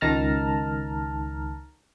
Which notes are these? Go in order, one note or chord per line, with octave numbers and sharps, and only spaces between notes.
C#2 D#3 A5 A#5 F6